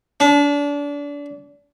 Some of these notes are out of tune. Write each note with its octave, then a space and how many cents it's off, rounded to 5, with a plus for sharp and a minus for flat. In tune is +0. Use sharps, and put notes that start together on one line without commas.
D4 -30